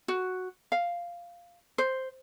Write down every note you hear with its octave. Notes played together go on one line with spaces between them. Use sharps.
F#4
F5
C5